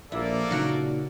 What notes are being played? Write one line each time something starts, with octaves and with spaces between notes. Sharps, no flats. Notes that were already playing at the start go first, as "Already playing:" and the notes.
A#1 A#3 E4 A4 D5
A#2 C#3 F#3 D#4 F#4